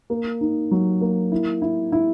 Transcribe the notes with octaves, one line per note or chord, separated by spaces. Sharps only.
A#3
D#4
F#3
A#3
E4
E4
E4